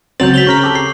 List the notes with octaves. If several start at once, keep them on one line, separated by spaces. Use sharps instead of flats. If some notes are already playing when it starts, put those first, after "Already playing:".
C#2 F#3 C4 G6 A6 F7 F#7
B6 F7 G7
C#3 A#4 C#6 B6
G4 A4
C7